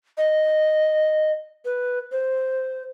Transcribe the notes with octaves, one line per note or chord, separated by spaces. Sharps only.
D#5
B4
C5